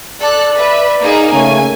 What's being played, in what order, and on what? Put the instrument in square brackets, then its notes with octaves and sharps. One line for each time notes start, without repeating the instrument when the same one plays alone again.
[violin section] A4 F#6 [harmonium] D5
[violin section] B4 E5
A#3 D#4 G#4
[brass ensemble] C#3 A#3 C#4 [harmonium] A3 [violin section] G#5